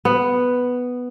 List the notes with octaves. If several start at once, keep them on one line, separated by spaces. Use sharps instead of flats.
B3